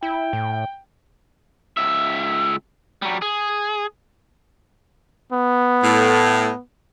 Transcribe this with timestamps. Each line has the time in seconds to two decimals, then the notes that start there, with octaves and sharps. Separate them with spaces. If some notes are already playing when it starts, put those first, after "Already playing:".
0.03 E4 G5
0.33 A2
1.77 C#2 E5
3.02 F#3 G3
3.22 G#4
5.32 B3
5.83 A2